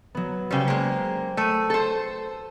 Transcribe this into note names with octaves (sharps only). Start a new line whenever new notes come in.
F#3 B3
C#3 G3 C5 G5
G#3 A#3
A3 E6 D#7
A4 C5